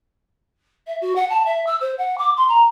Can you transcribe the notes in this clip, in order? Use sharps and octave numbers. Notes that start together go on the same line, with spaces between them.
E5
F#4
F#5
A5
E5
E6
C5
F#5
D6
C6
A#5